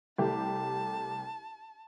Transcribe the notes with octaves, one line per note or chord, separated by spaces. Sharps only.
C2 A3 G4 A5